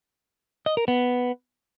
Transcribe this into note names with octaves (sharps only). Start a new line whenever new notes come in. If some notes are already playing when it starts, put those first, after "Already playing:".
D#5
A#4
B3